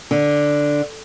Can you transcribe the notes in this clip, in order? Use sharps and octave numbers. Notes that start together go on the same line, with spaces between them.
D3